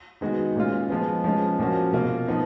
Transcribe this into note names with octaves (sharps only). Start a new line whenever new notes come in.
D#3 G#3 B3 F#4
A#2 G#3 C#4 F4
F3 G#3 B3
F3 G#3 C#4
A#2 F3 A#3 C#4 F#4
B2 A#3 F4
F3 B3 D#4